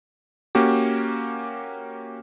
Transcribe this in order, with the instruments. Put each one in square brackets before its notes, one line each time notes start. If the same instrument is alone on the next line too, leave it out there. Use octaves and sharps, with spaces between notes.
[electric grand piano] A#3 C#4 F#4 G4